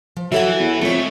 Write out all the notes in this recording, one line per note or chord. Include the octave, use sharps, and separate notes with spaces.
F3
E3 F#3 F#4 A4 E5
E2
F2 G#3 A3 A4 C#5